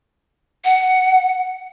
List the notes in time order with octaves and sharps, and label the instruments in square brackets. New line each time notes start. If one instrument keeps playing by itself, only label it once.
[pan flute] F#5